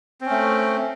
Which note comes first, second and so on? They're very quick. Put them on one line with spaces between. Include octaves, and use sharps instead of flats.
C4 C#4 A3